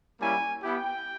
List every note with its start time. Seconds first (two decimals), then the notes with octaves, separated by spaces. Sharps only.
0.20 G3 A#3 C#4 E4 G#5
0.62 B3 E4 G4 G5